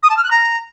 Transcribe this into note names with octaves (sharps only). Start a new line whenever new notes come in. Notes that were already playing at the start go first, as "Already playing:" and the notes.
D#6
A5
F6
F#6
A#5